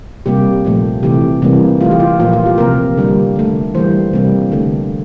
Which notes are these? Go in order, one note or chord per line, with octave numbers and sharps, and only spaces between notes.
C3 G3 A#3 G4
A#2 F3 A3
C3 E3 A3 G4
C3 E3 G3 A#3
E3 A3 F4
G4
F4
A#2 F3 A#3 F4
F4
G4
C3 F3 A#3 A#4
D3 G3 A#3
D3 A3
E3 G3 A#3 C5
C3 G3 A#3
D3 A3